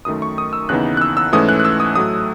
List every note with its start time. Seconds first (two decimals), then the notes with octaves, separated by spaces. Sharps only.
0.05 F#2 D#3 A3 D#6
0.22 C#6
0.38 D#6
0.53 E6
0.69 D#2 C#3 E3 B3 D#4 F#6
0.97 F#6
1.01 E6
1.17 E6
1.33 G#2 E3 A3 C#4 D#6
1.49 F#6
1.60 F#6
1.65 E6
1.80 D#6
1.96 A2 F#3 A3 D#6